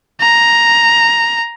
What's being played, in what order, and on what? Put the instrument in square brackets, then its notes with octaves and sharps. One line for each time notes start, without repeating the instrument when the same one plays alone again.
[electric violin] A#5